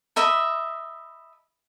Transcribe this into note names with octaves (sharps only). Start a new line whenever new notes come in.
D#5 E5 B5